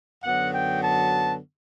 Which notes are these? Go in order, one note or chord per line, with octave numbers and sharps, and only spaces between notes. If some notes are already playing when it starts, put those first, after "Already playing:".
F#2 D3 F#3 B3 F#5
G5
A5